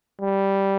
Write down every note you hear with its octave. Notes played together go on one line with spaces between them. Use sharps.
G3